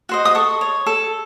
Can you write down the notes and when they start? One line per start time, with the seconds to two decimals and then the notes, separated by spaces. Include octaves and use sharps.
0.09 F#4 C5 D#5
0.25 D#6
0.35 A4 C#6
0.61 C#5
0.86 A4